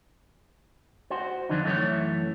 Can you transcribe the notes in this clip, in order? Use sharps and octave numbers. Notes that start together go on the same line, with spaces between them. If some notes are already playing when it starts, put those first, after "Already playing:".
F#4 C5
F2 D3 E3 D4 D#4
F#2 E3 A3 E4 C#5